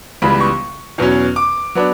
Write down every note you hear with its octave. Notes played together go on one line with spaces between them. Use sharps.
C#2 C#3 E3 G3 B3 B5
C#6
E2 B2 F#3 C#4
D6
F#3 B3 D4